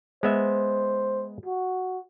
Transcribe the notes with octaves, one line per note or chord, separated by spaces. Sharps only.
G#3 B3 C5 E5
F#4